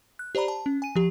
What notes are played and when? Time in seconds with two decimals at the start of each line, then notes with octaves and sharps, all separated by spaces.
0.19 F#6
0.35 G4 C5 D5 A#5 B5
0.48 A5
0.66 C#4
0.82 G#5 D#7
0.96 F3 G4